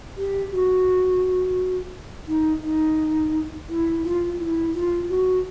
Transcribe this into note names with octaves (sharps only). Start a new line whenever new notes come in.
G4
F#4
D#4
D#4
E4
F4
E4
F4
F#4